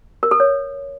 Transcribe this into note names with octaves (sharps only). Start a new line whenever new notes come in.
A#4
A4
C#5